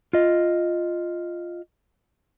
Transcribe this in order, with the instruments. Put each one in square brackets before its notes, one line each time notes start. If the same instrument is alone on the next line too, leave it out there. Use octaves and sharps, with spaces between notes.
[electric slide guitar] F4 D#5